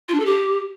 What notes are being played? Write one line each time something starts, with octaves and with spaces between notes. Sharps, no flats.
F4
D4
A4
G4